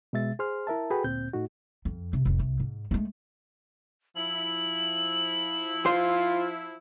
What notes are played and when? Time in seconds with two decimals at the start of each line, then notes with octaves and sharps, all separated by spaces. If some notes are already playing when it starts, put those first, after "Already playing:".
0.13 B2 G#3 E5 A6
0.39 G#4 C5 C6 F6
0.67 E4 A#4 E5 A5
0.90 F#4 G#4 A4 B4 G5 B5
1.04 D2 A#2 C4 G6
1.33 A2 A3 D#4 F#4
1.85 F2
2.13 C3
2.25 F1 A2
2.39 C2
2.60 G#2
2.91 G#3 A3
4.16 F3 E4 F#7
5.86 F4 C5